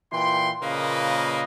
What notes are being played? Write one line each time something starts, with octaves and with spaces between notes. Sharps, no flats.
A#2 E3 G5 C6
A#2 C#3 F3 A#3 B4 D#5